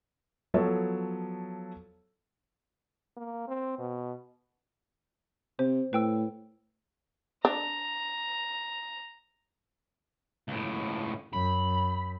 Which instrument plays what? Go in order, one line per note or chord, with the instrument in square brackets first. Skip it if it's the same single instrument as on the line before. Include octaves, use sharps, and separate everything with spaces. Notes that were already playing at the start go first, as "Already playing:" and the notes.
[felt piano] F3 F#3 B3 A4 C#5
[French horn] A#3
C4
B2
[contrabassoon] C3 [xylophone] C5
[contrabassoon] A2 [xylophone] B4 G5 E6
[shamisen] D4 [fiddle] A#5
[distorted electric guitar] C#2 A2
[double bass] F#2 [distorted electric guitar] B5